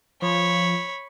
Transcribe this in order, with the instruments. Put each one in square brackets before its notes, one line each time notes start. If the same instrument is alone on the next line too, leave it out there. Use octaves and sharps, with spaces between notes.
[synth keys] F3 [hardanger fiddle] C#5 B5